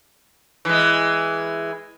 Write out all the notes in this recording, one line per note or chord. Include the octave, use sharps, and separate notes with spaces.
E3 G#3